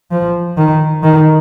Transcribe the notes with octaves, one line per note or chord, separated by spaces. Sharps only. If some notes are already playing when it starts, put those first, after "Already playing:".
F3
D#3
D#3